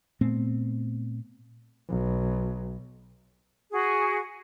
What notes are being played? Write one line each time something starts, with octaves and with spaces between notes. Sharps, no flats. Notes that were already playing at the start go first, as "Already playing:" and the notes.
A#2 A3 B3 C4
B1
F#4 G#4